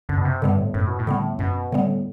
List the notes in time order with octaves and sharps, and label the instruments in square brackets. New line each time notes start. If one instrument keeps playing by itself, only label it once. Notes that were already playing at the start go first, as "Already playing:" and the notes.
[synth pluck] F#2 [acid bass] D3
[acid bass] B2
C3
[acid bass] G2 [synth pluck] D3 G3 B3
[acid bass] A2
[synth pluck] F#2 [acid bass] A2
[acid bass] B2
A2
[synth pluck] D3 G3 B3
[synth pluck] F#2 [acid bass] B2
[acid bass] A2 [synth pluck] D3 G3 B3